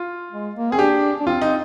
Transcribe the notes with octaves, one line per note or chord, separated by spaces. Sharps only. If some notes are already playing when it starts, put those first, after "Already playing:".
Already playing: F4
G#3
A#3
C4 G#4
D4 G4
D4
C4 F4
D#4